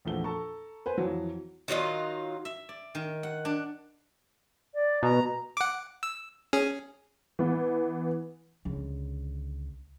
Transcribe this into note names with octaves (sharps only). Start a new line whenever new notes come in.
A#1 E2 F3 A3 G7
A4 A5 A#5 C#6
B4 C5 G#5
F2 E3 F#3
D#3 F#3 F4 D#5
E5
D5
D#3
F#5
D4
D5
B2 A#5
F#5 D6
E6
C#4 G#4
E3 B3
C#2 D3